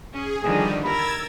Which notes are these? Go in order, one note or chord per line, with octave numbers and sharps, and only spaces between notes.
C#4 G#4
D3 D#3 F3 G3 G#4
A#4 B5 E6 G#6 A6